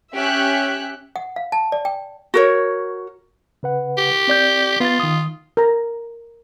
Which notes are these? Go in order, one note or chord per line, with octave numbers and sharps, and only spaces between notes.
C#4 G4 E5 F#6
F#5
F5
A5
D5
G5
F#4 A#4 C#5
C#3 B4 F#5
G4
C4 D5 G6
B3 F4 A6
D#3 D#6
A#4 A#5